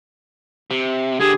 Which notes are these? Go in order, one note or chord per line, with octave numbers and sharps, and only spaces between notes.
C3
D3 G4 G#4